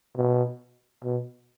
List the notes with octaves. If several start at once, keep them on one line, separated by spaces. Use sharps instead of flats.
B2
B2